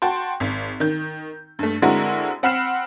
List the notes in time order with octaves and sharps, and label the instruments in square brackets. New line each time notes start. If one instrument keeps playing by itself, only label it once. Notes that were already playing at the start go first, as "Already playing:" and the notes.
[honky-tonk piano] F#4 G5 A5 C6
G#1
D#3 G6
G2 A3
D3 G#3 C4 E4 F#4 A#4
C4 F#5 B5 F6 C7 E7